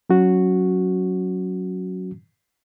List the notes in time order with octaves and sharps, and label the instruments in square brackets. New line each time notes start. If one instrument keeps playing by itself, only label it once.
[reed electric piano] F#3 C#4 F#4